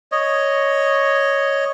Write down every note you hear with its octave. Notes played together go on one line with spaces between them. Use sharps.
C#5 D#5